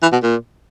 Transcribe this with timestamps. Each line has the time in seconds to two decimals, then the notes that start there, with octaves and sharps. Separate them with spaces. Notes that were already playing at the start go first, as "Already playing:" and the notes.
0.02 E3
0.12 B2
0.23 A#2